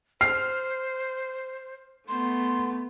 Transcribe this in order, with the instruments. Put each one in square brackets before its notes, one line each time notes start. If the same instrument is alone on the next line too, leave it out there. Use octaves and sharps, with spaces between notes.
[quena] C5 [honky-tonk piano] F6 [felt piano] C7
[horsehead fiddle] A3 B3 [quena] C6